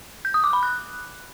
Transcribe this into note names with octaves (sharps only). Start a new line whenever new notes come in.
G6
D#6
D6
B5
F#6